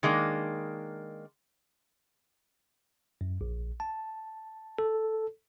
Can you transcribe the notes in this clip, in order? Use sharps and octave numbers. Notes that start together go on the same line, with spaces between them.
D#3 G#3 A#3 D4
F#2
A#1
A5
A4